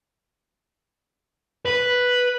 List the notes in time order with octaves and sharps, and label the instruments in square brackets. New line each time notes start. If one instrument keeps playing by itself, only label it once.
[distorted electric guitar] B4